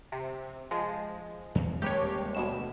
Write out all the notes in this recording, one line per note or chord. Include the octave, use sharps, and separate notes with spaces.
C3
F3 G#3
E2
D#1 G#3 G4 C#5
D2 B2 E7